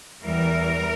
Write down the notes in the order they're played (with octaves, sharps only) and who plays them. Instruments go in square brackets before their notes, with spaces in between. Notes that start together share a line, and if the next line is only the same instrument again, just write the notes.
[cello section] E2 E3 G3 A#4